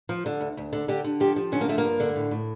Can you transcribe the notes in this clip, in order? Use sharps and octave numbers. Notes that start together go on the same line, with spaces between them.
F3
D3
D2
D2
D3
D3 G4
D3
F3 G4
F3
D3 C#4
A#3
F3 A3
A#3
G2
D3
A2
A2